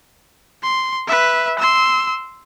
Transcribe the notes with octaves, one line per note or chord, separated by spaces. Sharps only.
C6
B4 E5
C6 E6